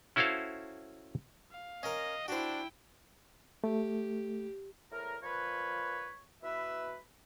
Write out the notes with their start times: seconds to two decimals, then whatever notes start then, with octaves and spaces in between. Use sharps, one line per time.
0.16 C#4 E4 F#4 A4 C5 F5
1.52 F5
1.83 C#4 A#4 D#5
2.28 D4 E4 F#4 C5 G5
3.64 A3 G4
4.91 E2 A2 A#4
5.23 A#2 F3 B4 C#5
6.43 B2 E4 B4 E5